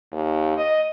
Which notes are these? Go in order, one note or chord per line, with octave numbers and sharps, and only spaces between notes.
D#2
D#5